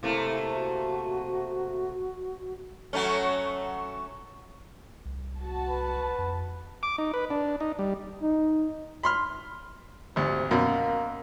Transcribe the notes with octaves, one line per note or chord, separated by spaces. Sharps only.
C3 A3 A#3 E4
F#4
F#3 A3 C#4
C2
F#4 A5
B4
F2
D6
D#4
B4
D4
D#4
G3
D#4
B5 C6 F6
G#1 D2 C3
F#2 B2 A#3